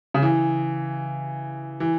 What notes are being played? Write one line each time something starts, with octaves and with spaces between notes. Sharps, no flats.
C#3
E3
E3